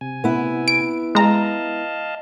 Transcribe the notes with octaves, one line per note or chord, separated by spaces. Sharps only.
C3 G#5
B3 E4
D7
G#3 D#5 F5 A5 A#5